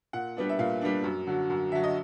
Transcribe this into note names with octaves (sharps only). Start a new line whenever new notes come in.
A#2 F#5
G3 B3 D4
E5
A#2 F5
G3 B3 D4
F#2
D3 F#3
F#2
D3 F#3 E5
D#5